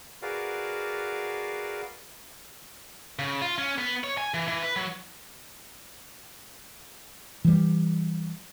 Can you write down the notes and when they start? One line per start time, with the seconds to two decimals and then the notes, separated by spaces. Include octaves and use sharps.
0.22 F#4 G#4 A#4 B4 D5 F5
3.19 C#3
3.42 F4
3.58 C#4
3.78 B3
4.04 C#5
4.18 G#5
4.34 E3
4.48 E3
4.63 B4
4.76 F#3
7.45 E3 G3